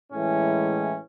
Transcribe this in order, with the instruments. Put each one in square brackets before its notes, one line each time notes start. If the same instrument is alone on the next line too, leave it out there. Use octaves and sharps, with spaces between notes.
[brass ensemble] A2 E3 G#3 C#4